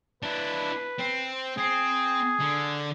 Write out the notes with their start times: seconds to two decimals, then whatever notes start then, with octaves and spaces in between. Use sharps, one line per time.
0.23 D4 E4 B4
0.99 C4
1.58 C4 G#4
2.40 D3